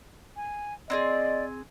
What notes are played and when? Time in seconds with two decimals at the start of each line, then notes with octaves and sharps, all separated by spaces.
0.36 G#5
0.90 C4 E4 G#4 D5 D#5